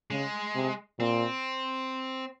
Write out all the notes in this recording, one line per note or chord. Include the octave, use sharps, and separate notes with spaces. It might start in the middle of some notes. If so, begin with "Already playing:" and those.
C#3 G#3
C3
A#2 C4